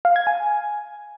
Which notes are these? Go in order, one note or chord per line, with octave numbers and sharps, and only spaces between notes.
F5
G#6
G#5